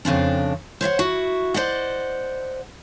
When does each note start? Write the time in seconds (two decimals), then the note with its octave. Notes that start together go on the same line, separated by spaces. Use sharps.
0.05 F2 C#3 C4 D4
0.81 C5 C#5 E5 F#5
0.99 E4 F#4
1.54 C5 D5 D#5 F#5